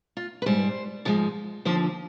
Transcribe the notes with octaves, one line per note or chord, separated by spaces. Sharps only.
F4
B4
G#2 G3 C5
G#2 F3 G#3
D#2 D3 F3 C5